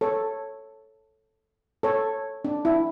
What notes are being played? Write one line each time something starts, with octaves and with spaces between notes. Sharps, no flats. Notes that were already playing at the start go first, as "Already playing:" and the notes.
A4 C#5
A4 C#5
D4
E4